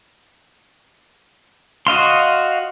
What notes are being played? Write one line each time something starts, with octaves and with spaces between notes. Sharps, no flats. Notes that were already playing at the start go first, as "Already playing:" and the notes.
F#4 D#5 F5 C6